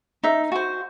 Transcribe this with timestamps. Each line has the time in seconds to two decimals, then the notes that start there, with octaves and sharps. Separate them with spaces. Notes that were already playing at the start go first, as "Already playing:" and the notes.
0.23 D#4 E5
0.52 F#4 C5